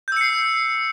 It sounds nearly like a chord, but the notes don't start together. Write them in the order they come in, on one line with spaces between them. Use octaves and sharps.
G6 E6 C#7 C7